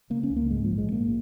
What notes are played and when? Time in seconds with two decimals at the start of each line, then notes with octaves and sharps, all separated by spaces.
0.10 C#3 A#3
0.23 C#4
0.31 C#2
0.36 A#3
0.51 G#2 G#3
0.65 F3
0.72 A#1
0.78 G#3
0.92 G#2 A#3